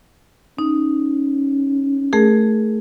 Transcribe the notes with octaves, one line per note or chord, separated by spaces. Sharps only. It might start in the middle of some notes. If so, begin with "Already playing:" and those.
C#4 D#4
A3 G#4 A#4